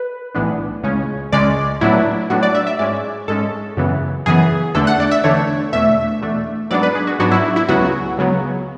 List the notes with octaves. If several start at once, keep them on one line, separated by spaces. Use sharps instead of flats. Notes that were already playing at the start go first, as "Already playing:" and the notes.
Already playing: B4
B1 A2 E3 B3 D4
C#2 C#3 G#3 C#4
C#2 C#3 G#3 C#4 D5
A2 F#3 B3 D4 E4
A2 F#3 B3 D4 F#4
D5
E5
E5
G#2 G#3 C#4 D5
G#2 G#3 C#4 A4
F#2 C#3 E3 B3
F#2 C#3 E3 B3 G#4
E2 D3 A3 D4 A4
F#5
D5
E5
E2 D3 A3 D4 C#5
E2 B2 A3 D4 E5
E2 B2 A3 D4
G#2 F#3 B3 D4 D5
B4
G#4
F#4
G#2 F#3 B3 D4 F#4
E4
E4
C#2 C#3 F#3 B3 F#4
C#2 C#3 F#3 B3